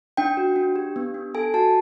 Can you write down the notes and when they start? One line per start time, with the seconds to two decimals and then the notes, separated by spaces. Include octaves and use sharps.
0.17 D4 G5
0.37 F#4
0.56 D4
0.76 G4
0.96 B3
1.14 D4
1.35 A4 G#5
1.54 F#4 A5